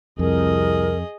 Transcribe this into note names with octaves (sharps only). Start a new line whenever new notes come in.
C2 F2 G#4 A#4 D#5